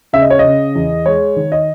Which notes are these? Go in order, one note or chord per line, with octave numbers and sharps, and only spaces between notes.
C#3 E5
D#5
C#5
D#5
C#3
E2
G#3 C#5
D#3
D#5